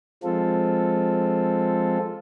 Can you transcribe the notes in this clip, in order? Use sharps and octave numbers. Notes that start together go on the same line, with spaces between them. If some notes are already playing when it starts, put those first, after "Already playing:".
F3 G#3 C4 F4 A4